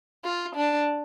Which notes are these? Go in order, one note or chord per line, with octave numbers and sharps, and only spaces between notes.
F4
D4